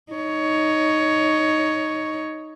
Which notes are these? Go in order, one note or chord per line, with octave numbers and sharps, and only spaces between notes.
D#4 C#5